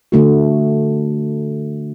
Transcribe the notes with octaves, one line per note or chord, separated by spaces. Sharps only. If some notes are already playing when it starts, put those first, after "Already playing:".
D3 A3 F#4